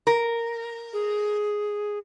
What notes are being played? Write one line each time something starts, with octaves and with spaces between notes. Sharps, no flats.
A#4
G#4